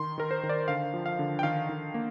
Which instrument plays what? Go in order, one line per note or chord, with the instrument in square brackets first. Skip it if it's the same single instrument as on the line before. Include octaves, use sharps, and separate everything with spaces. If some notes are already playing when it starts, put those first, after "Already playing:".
Already playing: [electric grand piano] D#3 C6
D#3 A#4
C5
D#3
D5
D3 F5
F3
F5
D3
G5
D#3 F5
D#3
A#3